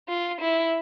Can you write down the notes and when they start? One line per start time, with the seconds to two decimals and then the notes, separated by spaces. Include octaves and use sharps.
0.08 F4
0.41 E4